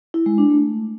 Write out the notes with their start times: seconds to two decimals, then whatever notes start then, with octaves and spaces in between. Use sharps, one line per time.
0.14 E4
0.26 G#3
0.38 D4
0.50 A3